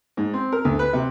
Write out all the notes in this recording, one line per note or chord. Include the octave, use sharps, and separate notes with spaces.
G#2
C4
A#4
D2
B4
C3